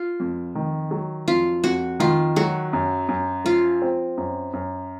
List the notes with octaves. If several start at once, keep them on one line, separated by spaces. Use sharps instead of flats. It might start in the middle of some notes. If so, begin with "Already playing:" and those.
Already playing: F4
F2
D#3
F#3
F2 F4
F2 F#4
D#3 F4
F#3 F#4
F#2
F#2
F3 F4
C4
F#2
F#2